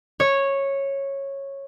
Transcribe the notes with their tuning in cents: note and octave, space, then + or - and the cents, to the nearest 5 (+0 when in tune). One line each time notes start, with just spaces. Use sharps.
C#5 -10